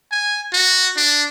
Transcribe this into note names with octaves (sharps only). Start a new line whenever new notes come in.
G#5
F#4
D4